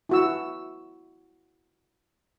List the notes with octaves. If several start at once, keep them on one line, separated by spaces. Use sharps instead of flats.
E4 F#4 E6